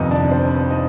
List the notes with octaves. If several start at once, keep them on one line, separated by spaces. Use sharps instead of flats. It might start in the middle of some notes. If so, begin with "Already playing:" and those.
Already playing: G1 F2 C3 D#3 D#4 D#5
D4 D5
C4 C5
D#4 D#5